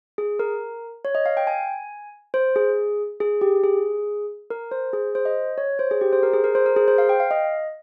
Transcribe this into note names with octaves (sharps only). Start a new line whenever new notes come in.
G#4
A#4
C#5
D#5
F5
G5
G#5
C5
G#4
G#4
G4
G#4
A#4
C5
G#4
C5
D#5
C#5
C5
G#4
G4
C5
A#4
G#4
A#4
C5
A#4
G#4
C5
F5
G5
F5
D#5